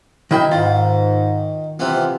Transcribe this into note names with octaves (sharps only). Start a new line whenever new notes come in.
D#3 D#4 E4 E5 G5
G#2 D#3 F4
C3 E3 B3 F4